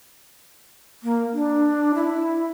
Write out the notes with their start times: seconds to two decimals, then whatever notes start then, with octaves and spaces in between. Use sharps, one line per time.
1.03 A#3
1.33 D4
1.95 E4